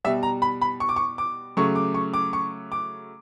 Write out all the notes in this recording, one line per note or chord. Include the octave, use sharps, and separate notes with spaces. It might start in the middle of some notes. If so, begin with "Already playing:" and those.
B2 G3 E5
A#5
B5
B5
C#6
D6
C#6
D6
C#3 F#3 A3 C#6
D6
C#6
D6
C#6
D6